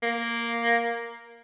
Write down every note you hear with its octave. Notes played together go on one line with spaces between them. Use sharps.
A#3